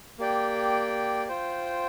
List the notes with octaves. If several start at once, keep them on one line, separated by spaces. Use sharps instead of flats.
A#3 G4 D5 G5
F4 C5 G5